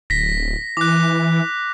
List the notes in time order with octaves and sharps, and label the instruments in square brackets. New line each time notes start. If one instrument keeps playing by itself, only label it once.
[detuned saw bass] D1 [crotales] A#6 B6
[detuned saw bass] E3 [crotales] D6 F#6